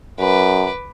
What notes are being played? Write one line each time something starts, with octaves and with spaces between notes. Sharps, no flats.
F#2 B4 D6